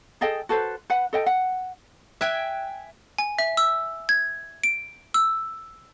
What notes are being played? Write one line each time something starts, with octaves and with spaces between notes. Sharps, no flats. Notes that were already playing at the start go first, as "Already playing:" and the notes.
G#4 A4 D#5 G5
F#4 A4 B4 C5
B4 F#5
A4 D#5 G5
F#5
E5 G5 G#5 F#6
G#5
E5
E6
G#6
D7
E6